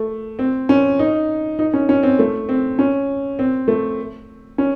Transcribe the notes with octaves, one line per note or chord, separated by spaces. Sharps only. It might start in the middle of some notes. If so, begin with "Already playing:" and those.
Already playing: A3
C4
C#4
D#4
D#4
C#4
C#4
C4
A3
C4
C#4
C4
A3
C#4